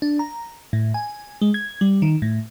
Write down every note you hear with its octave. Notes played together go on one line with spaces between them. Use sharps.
D4
A#5
A2
G#5
G#3
G#6
G3
D#3
A2